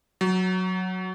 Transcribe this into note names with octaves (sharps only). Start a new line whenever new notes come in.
F#3